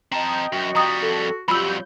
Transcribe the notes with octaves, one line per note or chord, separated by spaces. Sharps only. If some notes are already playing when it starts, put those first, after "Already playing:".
C4 D#5 G5 A5 A#5
F#2 F#4
F2 G3 A#5 D#6
A4
F2 F#3 G3 F4 B5 E6 G6